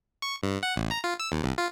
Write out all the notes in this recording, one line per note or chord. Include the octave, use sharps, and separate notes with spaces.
C#6
G2
F#5
A1
A#5
F4
E6
D#2
C2
F4